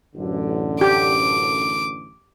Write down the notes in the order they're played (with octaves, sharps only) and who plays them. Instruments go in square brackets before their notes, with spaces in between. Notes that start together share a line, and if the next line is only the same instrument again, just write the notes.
[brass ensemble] A1 F#2 D3
[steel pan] G4 [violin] D6